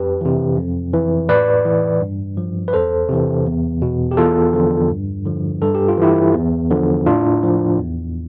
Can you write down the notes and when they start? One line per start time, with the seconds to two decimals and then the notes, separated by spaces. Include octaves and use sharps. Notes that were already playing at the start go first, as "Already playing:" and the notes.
Already playing: F2 G4 B4
0.21 C3 E3
0.57 F2
0.94 E3
1.29 A2 B4 D5
1.65 E3
2.01 G2
2.37 F3
2.68 B4
2.73 E2 A4 C5
3.09 C3 E3
3.46 E2
3.82 B2
4.11 G4
4.17 E2 F4 A4
4.53 D3 F3
4.90 G2
5.26 D3 F3
5.62 G2 A4
5.75 G4
5.88 F4
5.98 E3 E4 G4
6.34 E2
6.70 D3 F3
7.06 A2 D4 F4
7.43 F3
7.78 E2